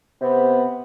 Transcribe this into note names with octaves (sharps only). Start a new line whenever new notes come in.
C3 B3